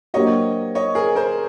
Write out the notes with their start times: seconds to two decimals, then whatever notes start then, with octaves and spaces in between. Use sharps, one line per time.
0.14 F#3 A#3 D4 G4 C5 C#5 D#5
0.75 C#5 D#5
0.95 G#4 A#4
1.15 A#4 C5